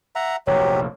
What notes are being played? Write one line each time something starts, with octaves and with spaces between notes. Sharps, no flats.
E5 F#5 A#5
F1 A#1 F#3 G4 C#5